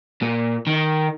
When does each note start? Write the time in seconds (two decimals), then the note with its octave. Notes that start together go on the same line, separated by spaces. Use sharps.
0.22 A#2
0.67 D#3